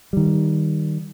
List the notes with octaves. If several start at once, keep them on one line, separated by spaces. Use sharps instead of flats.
D#3 G3